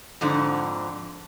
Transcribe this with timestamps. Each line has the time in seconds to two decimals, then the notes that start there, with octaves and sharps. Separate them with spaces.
0.21 F2 G#2 D3